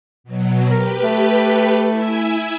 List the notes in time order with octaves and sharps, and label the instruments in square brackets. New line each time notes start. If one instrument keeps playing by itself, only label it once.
[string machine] B2 F#3
[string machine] G4 B4 [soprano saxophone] A#4
[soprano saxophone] A3
[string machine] E4 E5 G#5